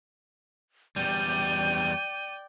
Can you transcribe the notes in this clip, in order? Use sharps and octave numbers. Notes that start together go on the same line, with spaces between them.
E2 G3 D5 G5 D#7